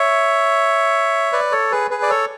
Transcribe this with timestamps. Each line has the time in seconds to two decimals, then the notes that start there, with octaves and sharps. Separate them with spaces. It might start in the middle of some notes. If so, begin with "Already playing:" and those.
Already playing: C#5 E5
1.32 B4 D5
1.52 A4 C#5
1.72 G#4 B4
1.91 G#4 B4
2.02 D5
2.10 A4 C#5